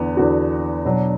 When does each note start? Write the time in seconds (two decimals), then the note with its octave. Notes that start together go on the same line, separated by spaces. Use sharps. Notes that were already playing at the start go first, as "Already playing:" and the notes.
Already playing: E2 D3 B3
0.17 E2 D3 B3 F#4
0.85 B2 F#3 D4